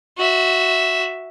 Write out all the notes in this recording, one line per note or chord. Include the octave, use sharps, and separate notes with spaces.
F#4 E5